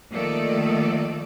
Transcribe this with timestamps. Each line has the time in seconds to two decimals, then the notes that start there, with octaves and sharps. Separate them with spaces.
0.12 D#3 F3 A3 A#3 A4 D5